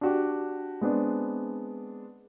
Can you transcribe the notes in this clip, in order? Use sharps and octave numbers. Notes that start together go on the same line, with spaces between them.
D4 F#4 G4
G#3 B3 C4 D4